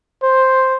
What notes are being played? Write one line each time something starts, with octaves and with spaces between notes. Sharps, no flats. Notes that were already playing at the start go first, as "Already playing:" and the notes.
C5